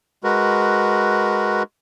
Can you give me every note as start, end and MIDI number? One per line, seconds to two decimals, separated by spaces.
0.24 1.63 56
0.24 1.63 66
0.24 1.63 70
0.24 1.63 71